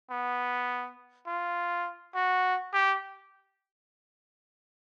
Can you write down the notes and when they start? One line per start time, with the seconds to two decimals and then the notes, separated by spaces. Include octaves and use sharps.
0.10 B3
1.27 F4
2.15 F#4
2.73 G4